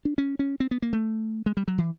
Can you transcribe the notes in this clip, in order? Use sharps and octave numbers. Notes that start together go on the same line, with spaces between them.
D4
C#4
C#4
C4
B3
A#3
A3
G#3
G3
F#3
E3